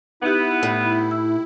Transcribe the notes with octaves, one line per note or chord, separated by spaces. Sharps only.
B3 D#4 E4 G4
A2
E6